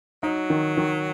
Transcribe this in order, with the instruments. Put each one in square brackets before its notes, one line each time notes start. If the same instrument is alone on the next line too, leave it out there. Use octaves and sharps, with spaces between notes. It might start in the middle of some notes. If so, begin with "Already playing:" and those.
[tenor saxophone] F#3 [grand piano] D#4
[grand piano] D#3
D#3